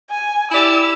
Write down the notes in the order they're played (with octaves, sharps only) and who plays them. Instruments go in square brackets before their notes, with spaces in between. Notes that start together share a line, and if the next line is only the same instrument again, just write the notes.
[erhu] G#5
[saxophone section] E4 G4 D5 [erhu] E6